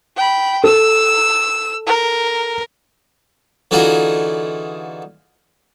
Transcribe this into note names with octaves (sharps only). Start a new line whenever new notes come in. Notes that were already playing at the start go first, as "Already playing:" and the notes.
G5 B5
A4 E6
A#4
D3 E3 D#4 F4 F#4 G#4